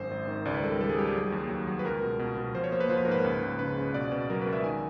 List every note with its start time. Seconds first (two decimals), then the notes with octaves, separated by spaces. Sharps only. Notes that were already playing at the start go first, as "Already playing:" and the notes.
Already playing: G#1 F#2 C5
0.11 G#1
0.27 D#3
0.45 C#2 D5
0.54 B4
0.63 G3 A4
0.72 A#4
0.81 G3 A4
0.89 G#4
0.98 G3 G4
1.07 G#4
1.15 F#3
1.32 D#2
1.50 F#3
1.67 F#3
1.79 B4
1.85 C#2 A#4
2.03 B2
2.19 B2
2.37 B2
2.55 F3 C5
2.64 C#5
2.72 A#3 C5
2.80 B4
2.90 F3 C5
2.97 B4
3.05 A#4
3.07 G#2 B4
3.24 C#2
3.43 C#2
3.59 C#3 B4
3.78 C#3
3.94 B2 D5
4.12 B2
4.30 F#3 A#4
4.41 B4
4.47 C#2
4.53 E5
4.64 D#3 G#5